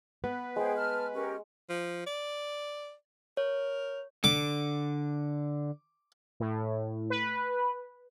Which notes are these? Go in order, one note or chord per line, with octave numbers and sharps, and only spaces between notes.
B3 B4
G#3 G#4 C5 F#5 G5
A5 F6
C#4 G4 A#4
F3
D5
A#4 C#5
D3 D6
A2
B4